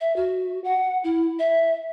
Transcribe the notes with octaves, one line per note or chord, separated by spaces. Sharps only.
E5
F#4
F#5
E4
E5